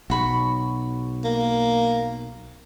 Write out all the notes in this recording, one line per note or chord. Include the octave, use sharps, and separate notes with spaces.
B1 F#4 B5 C#6
A#3